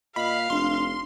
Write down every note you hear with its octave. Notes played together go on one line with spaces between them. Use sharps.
A#2 D#5 F5 B5
F1 D4 C6